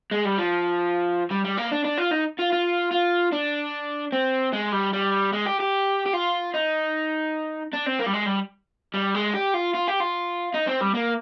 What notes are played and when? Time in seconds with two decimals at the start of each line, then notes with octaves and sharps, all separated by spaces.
0.11 G#3
0.25 G3
0.38 F3
1.31 G3
1.45 G3
1.58 A#3
1.72 D4
1.85 D4
1.98 F4
2.11 D#4
2.39 F4
2.52 F4
2.91 F4
3.32 D4
4.12 C4
4.53 G#3
4.72 G3
4.93 G3
5.33 G#3
5.46 G4
5.60 G4
6.06 G4
6.13 F4
6.54 D#4
7.74 D4
7.87 C4
8.00 A#3
8.07 G3
8.14 G#3
8.26 G3
8.94 G3
9.15 G#3
9.34 G4
9.54 F4
9.75 F4
9.88 G4
10.00 F4
10.54 D#4
10.68 C4
10.82 G3
10.95 A#3